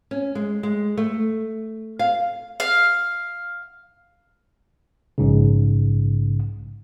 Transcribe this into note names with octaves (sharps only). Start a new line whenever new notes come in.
C#4
G#3
G#3
A3
F5
F5
A#1 G#2 C#3